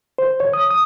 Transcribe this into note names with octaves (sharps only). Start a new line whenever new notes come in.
C5
C#5
D#6
D#6